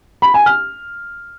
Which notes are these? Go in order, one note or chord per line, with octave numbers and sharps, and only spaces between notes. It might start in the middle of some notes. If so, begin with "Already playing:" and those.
B5
G#5
F6